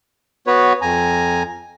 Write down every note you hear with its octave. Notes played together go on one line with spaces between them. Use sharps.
B3 F#4 B4 C#5
F2 G#5 A#5